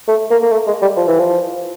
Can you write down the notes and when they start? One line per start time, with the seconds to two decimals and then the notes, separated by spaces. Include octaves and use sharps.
0.08 A3
0.31 A#3
0.43 A#3
0.52 A3
0.67 G#3
0.82 G3
0.97 F3
1.08 E3
1.19 F3